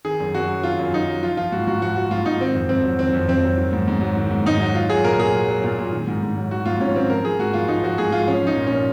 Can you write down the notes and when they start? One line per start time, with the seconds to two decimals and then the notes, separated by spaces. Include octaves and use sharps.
0.05 D#3 G#4
0.20 F#2
0.35 F#2 F#4
0.49 F#3
0.63 D#3 F4
0.79 F#2
0.93 F#2 D#4
1.08 F#3
1.22 F3 F4
1.37 F3 F4
1.52 G#2 F#4
1.67 G#2 F#4
1.82 F3 F#4
1.96 F3 F#4
2.11 G#2 F4
2.26 G#2 D#4
2.40 D#3 C4
2.55 F2
2.69 F2 C4
2.84 F#3
2.99 D#3 C4
3.13 F2
3.28 F2 C4
3.44 F#3
3.58 D#3
3.73 G#2
3.88 G#2
4.01 F#3
4.17 D#3
4.31 G#2
4.46 G#2 D#4
4.60 F#3
4.75 F#3 F4
4.89 F#3 G#4
5.04 A#2 A#4
5.19 A#2 G#4
5.34 F#3
5.49 F#3
5.64 A#2
5.79 A#2
5.93 D#3
6.07 G#2
6.23 G#2
6.37 F#3
6.51 D#3 F#4
6.66 G#2 F4
6.80 G#2 C#4
6.96 F#3 C4
7.10 F3 A#4
7.24 F3 G#4
7.39 G#2 F#4
7.54 G#2 F4
7.68 F3 D#4
7.84 F3 F#4
7.98 G#2 G#4
8.12 G#2 F4
8.27 F3 C#4
8.42 F3 D#4
8.57 A#2
8.67 C#4
8.72 A#2